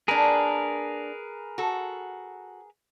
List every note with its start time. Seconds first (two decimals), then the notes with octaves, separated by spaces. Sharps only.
0.08 A#3 D4 G#4 A#4 B4
1.58 F#4 A4